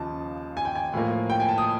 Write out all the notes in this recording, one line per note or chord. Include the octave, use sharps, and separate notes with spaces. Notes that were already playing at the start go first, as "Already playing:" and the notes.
Already playing: D#2 C#3 F3 D#5 A5
G#5
G5
G#5
A2 F3 A#3
G5
G#5
A5
D#6